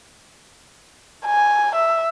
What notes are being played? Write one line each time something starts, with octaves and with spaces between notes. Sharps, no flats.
G#5
E5